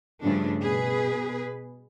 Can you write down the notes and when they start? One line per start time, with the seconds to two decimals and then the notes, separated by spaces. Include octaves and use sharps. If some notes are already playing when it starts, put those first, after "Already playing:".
0.23 G2 C#3 F3 G3 A3 D4
0.61 B2 G#4 B4